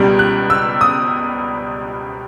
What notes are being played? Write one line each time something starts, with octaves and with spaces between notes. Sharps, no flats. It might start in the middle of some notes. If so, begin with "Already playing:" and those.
Already playing: C#2 B2 G3
F#6
E6
D#6